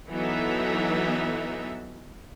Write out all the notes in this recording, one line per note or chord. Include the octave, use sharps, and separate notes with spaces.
E3 F#3 B3 D#4 A4 E5